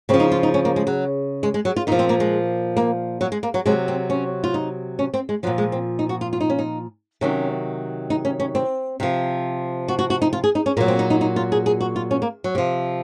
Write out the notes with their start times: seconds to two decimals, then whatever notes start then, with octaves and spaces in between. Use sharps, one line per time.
0.09 C#3 C4
0.14 F3
0.20 D#4
0.32 F4
0.43 D#4
0.54 C#4
0.65 A#3
0.76 G#3
0.87 F#3
1.43 G#3
1.54 G#3
1.65 F#3
1.76 F4
1.87 A#2 D#4
1.92 F3
1.99 C4
2.09 A#3
2.20 G#3
2.77 A#3
3.21 F#3
3.32 G#3
3.43 A#3
3.54 F#3
3.66 C3 F#3 G#3
3.88 C4
4.10 C#4
4.44 F4
4.54 D#4
4.99 C#4
5.14 C4
5.29 G#3
5.43 F3 F#3
5.47 A#2
5.58 G#3
5.72 C4
5.99 D#4
6.09 F#4
6.21 F4
6.33 F4
6.40 D#4
6.50 C#4
6.59 D#4
7.21 C3 D#3 F#3 C#4
8.10 D#4
8.25 C#4
8.40 C#4
8.55 C4
9.00 C3 F3
9.88 F#4
9.99 F#4
10.10 F#4
10.22 D#4
10.33 F4
10.44 G#4
10.55 D#4
10.66 C#4
10.77 A#2 A#3
10.80 F#3
10.88 C4
10.99 D#4
11.10 D#4
11.21 D#4
11.36 F4
11.52 G#4
11.66 G#4
11.81 F#4
11.96 F4
12.11 C#4
12.22 A#3
12.44 F#3
12.55 C3 F3